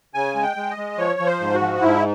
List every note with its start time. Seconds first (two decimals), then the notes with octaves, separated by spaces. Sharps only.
0.14 C#3 G#5
0.35 G#3
0.43 G5
0.57 G#3
0.71 D#5
0.77 G#3
0.98 F3 C#5
1.19 F3
1.26 C5
1.40 G#2
1.54 F#4
1.61 F3
1.82 G#2 E4